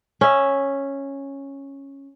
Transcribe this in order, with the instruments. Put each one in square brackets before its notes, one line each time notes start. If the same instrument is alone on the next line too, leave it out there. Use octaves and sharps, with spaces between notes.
[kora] C#4 E5